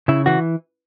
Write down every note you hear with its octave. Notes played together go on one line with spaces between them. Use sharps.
C#3 E4
E3 F#4